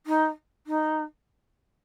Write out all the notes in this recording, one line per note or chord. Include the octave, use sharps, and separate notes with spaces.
D#4
D#4